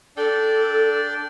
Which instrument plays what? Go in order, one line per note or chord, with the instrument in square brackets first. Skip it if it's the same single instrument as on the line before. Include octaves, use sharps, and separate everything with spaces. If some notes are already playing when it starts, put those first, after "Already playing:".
[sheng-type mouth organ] D4 D5 G5 [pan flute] A4